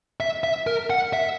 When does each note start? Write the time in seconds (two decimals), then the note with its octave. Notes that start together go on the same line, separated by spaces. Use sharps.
0.20 E5
0.44 E5
0.67 A#4
0.90 F#5
1.13 E5